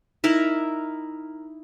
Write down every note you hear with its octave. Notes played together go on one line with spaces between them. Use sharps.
D#4 E4 A#4 E5